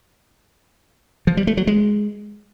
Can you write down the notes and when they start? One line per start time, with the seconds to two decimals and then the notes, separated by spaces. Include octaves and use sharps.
1.27 F3
1.37 G3
1.47 A3
1.57 F#3
1.67 G#3